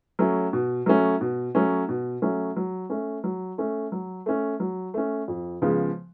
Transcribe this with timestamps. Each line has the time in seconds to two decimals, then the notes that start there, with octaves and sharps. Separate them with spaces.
0.19 F#3 A3 C#4
0.53 B2
0.86 F#3 A3 C#4
1.21 B2
1.55 F#3 A3 C#4
1.89 B2
2.22 F#3 A3 C#4
2.56 F#3
2.90 A3 C#4
3.24 F#3
3.58 A3 C#4
3.92 F#3
4.26 A3 C#4
4.60 F#3
4.94 A3 C#4
5.28 F2
5.62 C#3 F3 G#3 B3